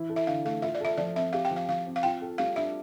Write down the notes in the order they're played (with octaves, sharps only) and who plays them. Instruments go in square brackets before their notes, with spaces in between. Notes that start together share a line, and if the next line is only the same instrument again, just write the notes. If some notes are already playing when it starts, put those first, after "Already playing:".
Already playing: [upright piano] E3 E4
A4
[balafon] E5
[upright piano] D3 [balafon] F5
[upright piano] A3 [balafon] F5
[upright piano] F4 [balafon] E5
[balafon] D5
[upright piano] A4 [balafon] E5
[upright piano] F3 [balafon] D5
[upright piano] C4 [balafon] E5
[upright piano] G4 [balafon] F5
[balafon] G5
[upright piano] F3
[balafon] F5
[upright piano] F3 [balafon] F5
[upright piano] C4
[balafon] F5
[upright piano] F4 [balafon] G5
[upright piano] A4
[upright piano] G3 [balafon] F5
[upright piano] D4 [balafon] E5